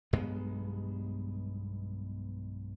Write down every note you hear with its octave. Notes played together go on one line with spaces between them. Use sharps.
B1 G2 G#3 B3